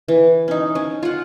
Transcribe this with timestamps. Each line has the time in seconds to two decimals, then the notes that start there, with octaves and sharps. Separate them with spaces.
0.08 E3
0.48 C#4 D#4
0.75 C#4
1.03 F4 F#5